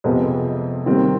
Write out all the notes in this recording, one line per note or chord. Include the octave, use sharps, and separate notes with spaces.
F2 C3 F3 G#3 B3
D#2 D#3 G3 C4